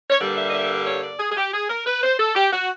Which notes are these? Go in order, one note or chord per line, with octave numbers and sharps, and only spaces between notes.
C#5
G2 D3 G3 A#3 D5
E5
D#5
E5
C#5
D5
G#4
G#4
G4
G#4
A#4
B4
C5
A4
G4
F#4